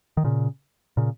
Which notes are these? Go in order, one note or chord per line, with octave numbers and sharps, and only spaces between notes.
D#3
A#2 C#3
A#2 C#3